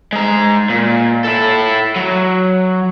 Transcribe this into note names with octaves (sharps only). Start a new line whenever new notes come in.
G#3 A#5
A#2
E4 A4
F#3